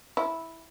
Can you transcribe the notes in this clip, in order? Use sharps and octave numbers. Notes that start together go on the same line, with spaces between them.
E4